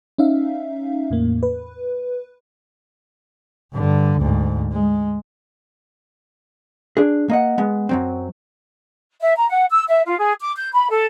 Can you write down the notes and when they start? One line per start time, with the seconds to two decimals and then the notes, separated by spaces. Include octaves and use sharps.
0.18 C#4 D#4 E5 F5
1.10 E2 A2 A#3
1.43 B4
3.73 G2 D3
4.19 D2 G#2
4.73 G#3
6.97 D4 G#4
7.29 A#3 D#5 F#5
7.58 G#3 B3
7.89 F#2 F#3 C4
9.21 E5
9.36 A#5
9.49 F#5
9.71 E6
9.89 E5
10.06 F4
10.19 G#4
10.41 D6
10.56 G6
10.73 B5
10.90 A4